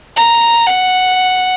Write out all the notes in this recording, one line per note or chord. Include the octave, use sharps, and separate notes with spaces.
A#5
F#5